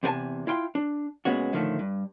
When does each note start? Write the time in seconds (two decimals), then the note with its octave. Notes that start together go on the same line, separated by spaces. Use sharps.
0.03 E2 C3 F4 A#4 G#5 A5
0.47 E4 F4 G5 C6
0.75 D4
1.25 A#2 G#3 B3 C#4 F#4
1.53 A2 D3 D#3 F3 G3 A3
1.79 G2